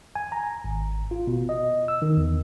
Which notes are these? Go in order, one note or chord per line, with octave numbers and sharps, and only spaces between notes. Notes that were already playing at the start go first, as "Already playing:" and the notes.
G#5
A#5
G#1
F4
B2
D#5
E6
D#3
E2